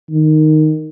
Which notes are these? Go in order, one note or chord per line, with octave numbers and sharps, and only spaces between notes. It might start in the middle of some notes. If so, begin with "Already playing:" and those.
D#3